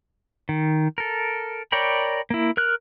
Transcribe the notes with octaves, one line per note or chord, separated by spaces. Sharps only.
D#3
A4 A#4
A#4 C#5 D5 G5 B5
A#3 E4
A#4 F6 F#6